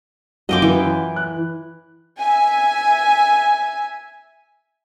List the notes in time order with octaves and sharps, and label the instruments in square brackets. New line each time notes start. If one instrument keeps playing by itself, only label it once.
[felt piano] F#2 F4 [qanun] D#5 G5 D6
[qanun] E3
[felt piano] F#6
[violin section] E5 G#5